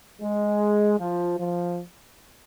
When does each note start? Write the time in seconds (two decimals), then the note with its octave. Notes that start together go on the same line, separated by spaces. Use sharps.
0.21 G#3
1.00 F3
1.39 F3